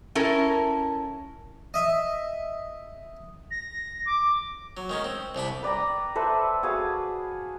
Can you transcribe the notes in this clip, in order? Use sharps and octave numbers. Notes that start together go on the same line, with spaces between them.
C#4 E4 A4 A#4
D#5 E5
A#6
D6
F#3
D#3 G#3 C#4
C4
C2 C3 D4 B5
B4 D5 G5 A#5
A4 B4 C5 E5
F#4 G#4 B4 F5